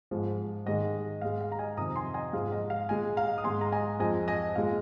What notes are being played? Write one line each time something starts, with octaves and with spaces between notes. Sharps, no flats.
G#2 F3 G#3
G#2 D#3 G#3 D#5
G#2 G#3 F5
F5
A#5
D#5 G#5
F2 C3 D#3 A#5 D#6
G#5 C6
D#5 G#5
G#2 F3 G#3 F5
D#5
F5
A#2 G#3 D#5 G#5
F5 A#5
D#6
G#2 G#3 G#5 C6
A#5
D#5 G#5
F2 F3 G#3 D#5 G#5
D#5 G#5
A#2 G#3 F5